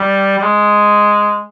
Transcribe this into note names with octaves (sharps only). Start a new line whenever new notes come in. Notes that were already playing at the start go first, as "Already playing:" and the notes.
Already playing: G3
G3
G#3